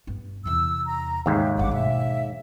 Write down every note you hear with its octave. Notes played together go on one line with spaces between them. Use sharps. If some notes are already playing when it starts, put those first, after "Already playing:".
G2 B3
E2 C3 E6
A#5
D#2 G#2 C#3 C#4 G4 E5
A1 G2 F#5 D6
B2 E5